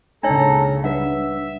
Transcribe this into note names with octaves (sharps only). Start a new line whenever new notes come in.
C#2 A#2 C#3 D4 D#4 A4 C#5 A#5
G3 D4 B4 E5 F#5